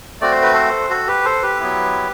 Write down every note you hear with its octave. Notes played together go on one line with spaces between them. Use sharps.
A3 C4 F#4 D5
C5
B4
A4 C5
F#4 A4
G4 B4
A4 C5
G4 B4
F#3 B3 E4